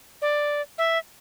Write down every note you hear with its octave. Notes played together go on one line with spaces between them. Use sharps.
D5
E5